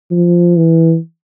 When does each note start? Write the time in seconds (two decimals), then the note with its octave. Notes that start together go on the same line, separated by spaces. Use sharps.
0.11 F3
0.57 E3